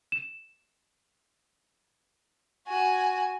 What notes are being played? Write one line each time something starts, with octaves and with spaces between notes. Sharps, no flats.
E7
F#4 G#5